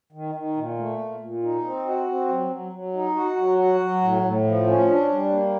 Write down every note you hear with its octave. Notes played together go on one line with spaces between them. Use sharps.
D#3
D#3
A#2
A3
A#2
A#2
D#4
C4
F#4
C4
F#3
F#3
F#3
D#4
F#4
F#3
F#4
F#3
A2
A2
F3
C#4
D4
G3
A#3